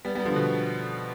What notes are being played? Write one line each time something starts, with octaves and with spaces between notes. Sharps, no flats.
G3 B3
G3 B3
D3 F3
B2 D3